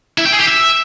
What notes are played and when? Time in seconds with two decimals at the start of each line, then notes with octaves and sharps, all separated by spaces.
0.18 E4
0.25 G5
0.33 G#4
0.40 G4
0.47 E5